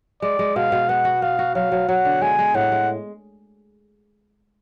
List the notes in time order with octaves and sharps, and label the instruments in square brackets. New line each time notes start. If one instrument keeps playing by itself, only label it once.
[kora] G#3 [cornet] D5
[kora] G#3
[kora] B2 [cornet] F5
[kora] B2
[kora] B3 [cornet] F#5
[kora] F#4
[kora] B3 [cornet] F5
[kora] F#4
[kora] F#3 [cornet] F5
[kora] F#3
[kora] F#3 [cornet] F#5
[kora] D3
[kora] G#3 [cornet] G#5
[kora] G#3
[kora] A2 [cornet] F#5
[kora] G#3